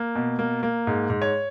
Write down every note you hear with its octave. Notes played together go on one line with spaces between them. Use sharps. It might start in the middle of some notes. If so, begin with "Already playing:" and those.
Already playing: A#3
B2
A#3
A#3
G#2
G#2
C#5